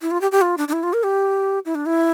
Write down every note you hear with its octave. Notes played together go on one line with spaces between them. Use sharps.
E4
F4
G4
G4
F4
D4
D4
E4
F4
A#4
G4
E4
D4
E4